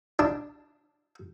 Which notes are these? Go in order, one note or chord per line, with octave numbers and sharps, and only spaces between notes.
D4